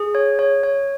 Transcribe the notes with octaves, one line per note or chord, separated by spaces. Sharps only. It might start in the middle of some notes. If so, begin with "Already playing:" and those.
Already playing: G#4
C#5
C#5
C#5